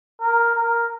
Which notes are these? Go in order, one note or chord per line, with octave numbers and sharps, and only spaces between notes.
A#4
A#4